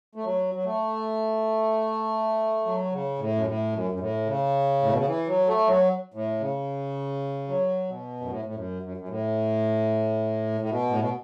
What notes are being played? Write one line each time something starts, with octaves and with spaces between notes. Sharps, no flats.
A3
F#3
F#3
A3
F#3
C#3
A2
F#2
A2
F#2
F#2
A2
C#3
A2
B2
C#3
E3
F#3
A3
F#3
A2
C#3
F#3
B2
F#2
A2
A2
F#2
F#2
F#2
A2
A2
B2
A2
B2